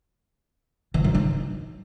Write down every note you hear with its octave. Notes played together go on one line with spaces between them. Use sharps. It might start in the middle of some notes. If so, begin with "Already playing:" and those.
E3
F#3
D#4